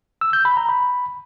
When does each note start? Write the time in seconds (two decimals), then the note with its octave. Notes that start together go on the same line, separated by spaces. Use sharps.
0.21 E6
0.33 G6
0.45 B5
0.57 A#5
0.69 B5